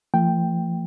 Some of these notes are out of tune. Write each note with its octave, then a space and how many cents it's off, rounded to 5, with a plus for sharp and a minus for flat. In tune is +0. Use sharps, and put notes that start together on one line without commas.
F3 -40 A3 +35 G5 +0